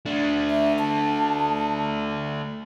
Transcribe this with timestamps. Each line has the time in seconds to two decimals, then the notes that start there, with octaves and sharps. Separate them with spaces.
0.06 A3 D4
0.50 E5
0.79 A5